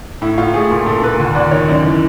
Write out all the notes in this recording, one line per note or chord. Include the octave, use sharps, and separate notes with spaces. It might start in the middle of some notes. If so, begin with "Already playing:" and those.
A2 E4
A2 F4
A3 G#4
A#2
A#2 A4
A#2 B4
D#2
D#2 D5
D#3 C#5
F#2 D5
E3